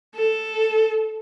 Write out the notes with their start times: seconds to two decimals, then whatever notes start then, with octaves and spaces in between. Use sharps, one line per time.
0.15 A4